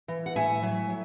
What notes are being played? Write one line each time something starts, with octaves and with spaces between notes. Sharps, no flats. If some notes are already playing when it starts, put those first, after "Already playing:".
E3
F#5
A2 E5 G#5
F#3
F#3